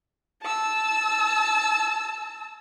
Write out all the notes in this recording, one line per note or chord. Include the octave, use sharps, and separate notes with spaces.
A5 E6